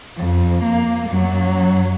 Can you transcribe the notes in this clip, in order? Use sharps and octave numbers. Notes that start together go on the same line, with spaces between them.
F2
A#3
F#2 F#3